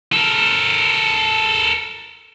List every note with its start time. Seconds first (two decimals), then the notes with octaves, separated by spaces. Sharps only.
0.13 A4 A#4